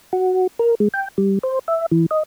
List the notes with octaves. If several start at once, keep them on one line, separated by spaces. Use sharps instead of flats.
F#4
A#4
G#3
G5
G3
C5
E5
E3
D#5